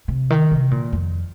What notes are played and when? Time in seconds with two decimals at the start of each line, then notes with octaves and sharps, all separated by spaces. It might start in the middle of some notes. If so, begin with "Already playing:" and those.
0.08 C3
0.30 D#3
0.51 C3
0.71 A#2
0.92 F2